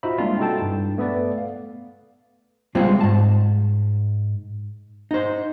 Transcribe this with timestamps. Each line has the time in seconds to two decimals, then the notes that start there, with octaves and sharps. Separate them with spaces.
0.03 D#4 F4 F#4 C5 E5 B5
0.18 G3 G#3 A#3 C4 D4 F4
0.39 D#4 E4 F#4 A4 G5 A5
0.62 G2
0.98 A3 B3 A4 B4 D5
1.38 F5
2.75 G3 G#3 C4 F4 B4
3.01 G#2 A5
5.11 D#4 C5